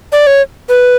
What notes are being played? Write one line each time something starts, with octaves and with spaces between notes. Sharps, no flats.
D5
C#5
B4